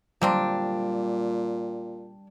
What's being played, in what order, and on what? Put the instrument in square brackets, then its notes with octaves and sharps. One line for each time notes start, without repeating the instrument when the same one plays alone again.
[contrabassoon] A#2 [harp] G3 [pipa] A#3 C4 D4